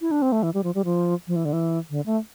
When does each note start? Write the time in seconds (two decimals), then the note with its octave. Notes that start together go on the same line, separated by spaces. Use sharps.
0.01 E4
0.11 D4
0.22 C4
0.32 A3
0.43 E3
0.54 G3
0.64 F3
0.75 G3
0.85 F3
1.27 F3
1.36 E3
1.45 D3
1.53 E3
1.90 D3
2.06 A3